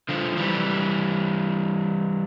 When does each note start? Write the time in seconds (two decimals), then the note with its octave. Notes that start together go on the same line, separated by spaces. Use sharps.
0.09 D3 F3
0.37 E3 G3